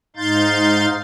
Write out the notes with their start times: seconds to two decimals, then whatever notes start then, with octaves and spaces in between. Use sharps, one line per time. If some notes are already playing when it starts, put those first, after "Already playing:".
0.16 G#2 D#4 F5 C6 G6 A6